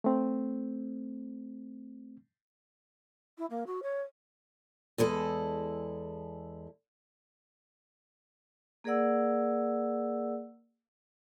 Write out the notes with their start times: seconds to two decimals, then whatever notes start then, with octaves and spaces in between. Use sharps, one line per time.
0.04 A3 C4
3.38 E4
3.50 A#3
3.66 F#4
3.83 C#5
4.98 E2 G#3 E4 A4
8.84 A#3 G#4 A#4 D5 F#5 E6